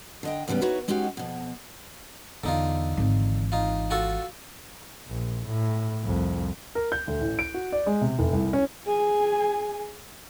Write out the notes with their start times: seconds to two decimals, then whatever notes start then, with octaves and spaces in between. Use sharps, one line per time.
0.23 D3 D#5 G5
0.48 E2 G2 C#3 G3 B3
0.62 D#4 E4 F#4 B4 C#5
0.88 G#3 C#4 D#4 F#4 G4
1.17 F2 B2
2.44 E2 D3 D#4 F4
2.97 G#1 E3
3.52 D#4 F4
3.90 F4 F#4 A4
5.07 A#1
5.47 A2
6.04 C2 F2
6.75 A#4
6.92 G6
7.07 D2
7.21 A1
7.39 D7
7.54 F#4
7.72 D5
7.86 G#3
8.01 C3
8.19 F1
8.33 C2
8.53 C#4
8.87 G#4 G#5